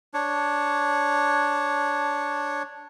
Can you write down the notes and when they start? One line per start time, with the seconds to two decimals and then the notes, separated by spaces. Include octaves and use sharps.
0.14 D4 C#5